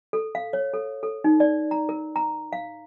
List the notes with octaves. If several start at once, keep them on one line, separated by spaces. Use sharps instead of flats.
A4
F5
C#5
A4
A4
D#4
D5
A#5
A#4
A#5
F5